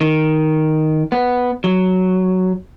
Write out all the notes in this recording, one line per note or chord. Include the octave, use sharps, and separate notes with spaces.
D#3
B3
F#3